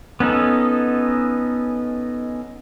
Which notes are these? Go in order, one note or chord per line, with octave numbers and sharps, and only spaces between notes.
B3 C#4 D#4 A4